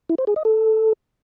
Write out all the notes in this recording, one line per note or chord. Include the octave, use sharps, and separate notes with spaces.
E4
C5
G#4
D#5
A4